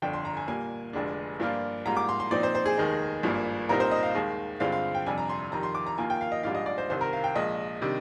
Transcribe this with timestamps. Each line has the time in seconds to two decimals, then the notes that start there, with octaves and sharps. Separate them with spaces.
0.02 G1 F2 D3 G5
0.13 C6
0.25 A#5
0.37 G#5
0.47 A#2 G3 A#3 G#5
0.93 F1 F2 D3 G#3 D4
1.40 G2 F3 A#3 D4 F4
1.86 G#2 G3 A#3 F4 A#5
1.97 D6
2.09 C6
2.20 C6
2.31 A#2 F3 C4 D#4 D5
2.43 C5
2.55 C5
2.66 G#4
2.78 F1 D#2 D#3 G#3 D#4
3.23 G#1 G2 F3 A#3
3.69 C2 A#2 G3 C4 D#4 A#4
3.80 C5
3.91 D#5
4.03 F5
4.15 D#2 D#3 G#3
4.60 G2 D3 G#3 C4 F4 F5
4.72 F5
4.95 G5
5.06 F2 C3 G3 D4 G#5
5.18 A#5
5.29 C6
5.52 F2 D#3 G3 A#5
5.63 C6
5.75 D6
5.87 A#5
5.98 D#2 D#3 A#3 F4 G#5
6.10 G5
6.21 F5
6.32 D#5
6.43 A#1 G#2 G3 D4 F4 F5
6.55 D#5
6.66 D5
6.78 C5
6.90 C2 C3 D#3 C5
7.01 A#4
7.13 F5
7.24 G5
7.35 A#1 A#2 G#3 D#5
7.81 C3 D#3 G3 D4